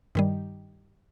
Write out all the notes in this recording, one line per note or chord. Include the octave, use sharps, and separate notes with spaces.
G2 D#3 G3